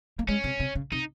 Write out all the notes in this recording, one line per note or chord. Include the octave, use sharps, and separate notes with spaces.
A#3
G#3 C#4
C3
C3
C#3
C3 D#4